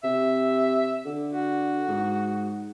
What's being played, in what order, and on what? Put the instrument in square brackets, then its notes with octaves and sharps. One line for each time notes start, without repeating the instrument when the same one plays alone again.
[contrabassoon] C3 [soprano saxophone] E5
[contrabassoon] D3
[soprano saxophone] F#4
[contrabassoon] G#2